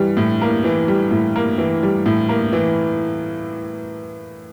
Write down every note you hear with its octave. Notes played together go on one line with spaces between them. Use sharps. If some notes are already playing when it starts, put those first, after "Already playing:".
Already playing: E3 G3
A2
A#3
E3
G3
A2
A#3
E3
G3
A2
A#3
E3